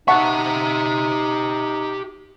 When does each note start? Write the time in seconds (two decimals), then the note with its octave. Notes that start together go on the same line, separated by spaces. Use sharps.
0.08 D#4 G4 E5 F#5 A5 C#6